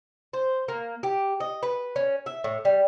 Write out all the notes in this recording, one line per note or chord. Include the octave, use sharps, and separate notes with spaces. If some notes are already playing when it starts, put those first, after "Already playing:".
C5
A#3
G4
D#5
B4
C#4
E5
A2
G3